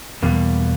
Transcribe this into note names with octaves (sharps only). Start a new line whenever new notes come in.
E2 B2 G3 A#3